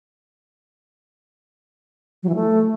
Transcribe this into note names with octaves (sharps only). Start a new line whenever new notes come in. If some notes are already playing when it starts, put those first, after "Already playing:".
F#3
E3
A3